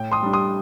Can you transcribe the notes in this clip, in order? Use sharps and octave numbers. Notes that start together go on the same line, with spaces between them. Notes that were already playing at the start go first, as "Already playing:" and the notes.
Already playing: A2 G5
C6 D#6
G3 D4
C6 D#6